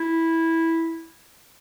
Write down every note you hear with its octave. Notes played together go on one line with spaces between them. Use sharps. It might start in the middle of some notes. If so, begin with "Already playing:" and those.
Already playing: E4